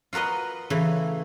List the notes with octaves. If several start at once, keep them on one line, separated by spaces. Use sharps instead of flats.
F4 F#4 A#4 B4 D#5
C#3 E3 A3